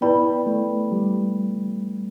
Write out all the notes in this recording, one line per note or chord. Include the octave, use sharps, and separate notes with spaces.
B3 E4 B4 D5 G5 B5
A3
G3